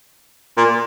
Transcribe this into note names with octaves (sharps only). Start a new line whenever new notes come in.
A#2